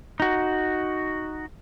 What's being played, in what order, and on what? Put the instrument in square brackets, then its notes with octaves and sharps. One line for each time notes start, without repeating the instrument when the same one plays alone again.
[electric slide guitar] D#4 F#4